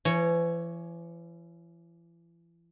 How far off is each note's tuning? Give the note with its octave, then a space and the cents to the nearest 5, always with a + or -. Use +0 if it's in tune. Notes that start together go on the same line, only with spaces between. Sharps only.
E3 +40 C#5 +0